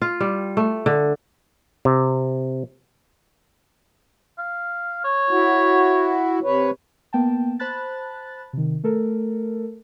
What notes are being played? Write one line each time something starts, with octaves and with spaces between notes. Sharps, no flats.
F4
G3
A3
D3
C3
F5
C#5
E4 F#4
C3 B4 C#5
A#3 B3 G5 A5
C5 A5 B5 F#6 A6
C3 D#3
A3 A4 A#4